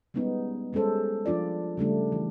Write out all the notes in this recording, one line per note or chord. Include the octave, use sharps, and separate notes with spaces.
G3 G#3 B3 C#4 D#4
G3 G#3 C#4 A4 C5
F3 D4 F4 D5
C#3 G3 A3 D4
E3